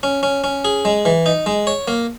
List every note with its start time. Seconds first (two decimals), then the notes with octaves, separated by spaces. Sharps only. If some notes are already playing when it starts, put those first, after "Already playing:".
0.03 C#4
0.23 C#4
0.44 C#4
0.65 G#4
0.85 G#3
1.05 E3
1.26 D#4
1.46 G#3
1.67 C#5
1.88 A#3